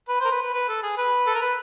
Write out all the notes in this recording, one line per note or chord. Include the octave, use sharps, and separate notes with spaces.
B4
A#4 C5
B4
B4
B4
A4
G#4
B4
A4
A#4
B4